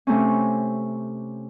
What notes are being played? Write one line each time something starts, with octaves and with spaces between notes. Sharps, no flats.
C3 A3 C4 C#4